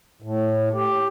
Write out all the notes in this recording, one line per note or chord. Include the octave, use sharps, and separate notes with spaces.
A2
G4